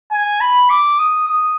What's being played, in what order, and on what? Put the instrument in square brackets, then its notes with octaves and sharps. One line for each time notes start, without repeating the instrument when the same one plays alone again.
[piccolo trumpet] G#5
B5
D6
D#6
D#6